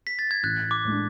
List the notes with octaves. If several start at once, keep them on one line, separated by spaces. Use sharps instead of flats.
B6
A6
G#6
A1 F#6
D6
A2 G#3 D4